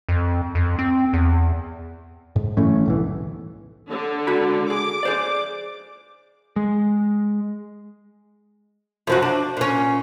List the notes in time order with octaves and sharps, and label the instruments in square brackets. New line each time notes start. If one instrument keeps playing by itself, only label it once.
[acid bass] F2
F2
C4
E2
[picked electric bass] G#2
G1 E3 A3 C#4
D1 B1 E3
[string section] D3
[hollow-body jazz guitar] C#2 F#4 B5
[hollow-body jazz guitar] G#4 [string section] D6
[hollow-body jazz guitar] G#4 C5 D5
[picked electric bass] G#3
[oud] F#2 F3 F#4
D4
A#2 C#4